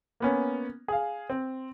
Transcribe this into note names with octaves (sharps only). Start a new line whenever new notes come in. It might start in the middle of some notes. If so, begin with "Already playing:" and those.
A#3 B3 C#4
G#4 F5
C4